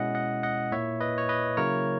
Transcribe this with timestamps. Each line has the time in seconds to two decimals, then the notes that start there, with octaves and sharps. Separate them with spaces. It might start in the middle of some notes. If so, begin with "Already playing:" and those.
Already playing: B2 G#3 C#4 E4 D#5 F#5
0.15 D#5 F#5
0.43 D#5 F#5
0.72 A#2 A#3 E4 C#5 E5
1.00 B4 D#5
1.18 C#5
1.29 B4 D#5
1.57 C#3 F#3 A#3 E4 A#4 C#5